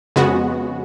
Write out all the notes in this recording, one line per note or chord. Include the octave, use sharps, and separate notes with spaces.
F2 C#3 G#3 B3 F#4